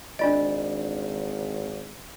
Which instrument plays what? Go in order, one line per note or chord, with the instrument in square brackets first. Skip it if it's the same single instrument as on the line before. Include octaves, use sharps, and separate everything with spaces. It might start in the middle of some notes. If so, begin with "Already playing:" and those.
[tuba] G#1 [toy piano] D4 F4 D#5 [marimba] D5